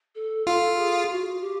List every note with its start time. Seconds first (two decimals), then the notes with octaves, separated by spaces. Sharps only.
0.15 A4
0.47 F4 A4
0.78 G#4
1.10 F#4
1.41 G4